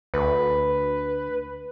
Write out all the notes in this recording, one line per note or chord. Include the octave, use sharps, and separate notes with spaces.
D2 B4